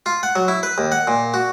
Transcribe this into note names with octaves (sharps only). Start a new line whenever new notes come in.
F4
F#5
F#3
E4
B4
D#2
F#5
A#2
F#4